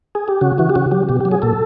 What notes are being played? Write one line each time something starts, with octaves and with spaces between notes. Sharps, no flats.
G#4
G4
C#3 F#4
E3 F#4
G4
C#3 F#4
F#3 G4
B2 G4
G4
F#3
G#4
A#2 A4